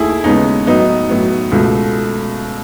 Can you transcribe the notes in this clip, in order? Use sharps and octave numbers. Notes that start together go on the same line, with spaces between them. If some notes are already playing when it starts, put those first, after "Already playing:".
Already playing: D#2 D#3 A3 E4 G#4
D#2 C#3 G#3 B3 D#4
A2 F#3 B3 D#4
A2 F#3 B3
C#2 B2 A3